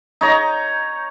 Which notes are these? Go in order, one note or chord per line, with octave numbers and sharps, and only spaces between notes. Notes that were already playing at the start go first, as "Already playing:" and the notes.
D#4 C#5 A#5